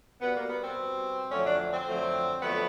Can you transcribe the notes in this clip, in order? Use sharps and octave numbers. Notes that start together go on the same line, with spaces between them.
B2 G3 B3
A#3
B3
C4
B2 G3
F2 D3 F#3 A3 C#4
D4
C4
F2 D3 F#3 A3
F2 D3 F#3 A3 B3